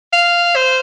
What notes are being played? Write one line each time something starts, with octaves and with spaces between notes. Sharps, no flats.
F5
C5